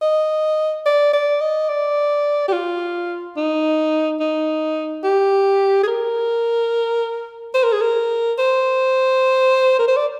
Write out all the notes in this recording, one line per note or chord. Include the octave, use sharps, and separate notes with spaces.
D#5
D5
D5
D#5
D5
G4
F4
D#4
D#4
G4
G#4
A#4
C5
A#4
G#4
A#4
C5
A#4
C5
D5